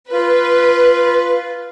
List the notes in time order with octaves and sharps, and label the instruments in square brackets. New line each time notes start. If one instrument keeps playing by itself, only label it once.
[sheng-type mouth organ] F4 [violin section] B4